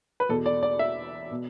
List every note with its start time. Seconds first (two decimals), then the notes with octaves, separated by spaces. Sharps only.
0.20 B4
0.29 E2 B2 A4
0.46 D5
0.63 D5
0.79 E5
1.31 B2